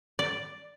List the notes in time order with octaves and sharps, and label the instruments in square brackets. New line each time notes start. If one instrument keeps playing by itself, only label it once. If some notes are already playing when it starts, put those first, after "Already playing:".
[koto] D5